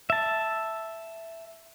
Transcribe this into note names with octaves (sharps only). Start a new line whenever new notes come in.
E5 A5